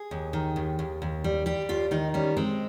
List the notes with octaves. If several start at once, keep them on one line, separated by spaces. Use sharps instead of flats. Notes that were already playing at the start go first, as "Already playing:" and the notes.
Already playing: G#4
D#2
D#3
D#2
D#2
D#2
G3
G3 G4
D#2 F4
D#3 D#4
G3 C#4
G#3 C4